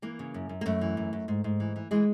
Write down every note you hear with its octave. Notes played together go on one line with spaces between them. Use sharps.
E3 A#3
C#3
F#2
F#2
A#3
F#2 A3
E3
F#2
F#2
G#2
G#2
E3
E3
E3 G#3